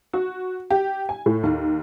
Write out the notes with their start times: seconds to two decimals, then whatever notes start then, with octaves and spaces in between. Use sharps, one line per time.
0.13 F#4
0.71 G4
1.09 G#5
1.26 A2
1.43 D#2